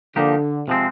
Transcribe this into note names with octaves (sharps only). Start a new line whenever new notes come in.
D3 F3 A#3 D#4 G4
C3 F3 G#3 C4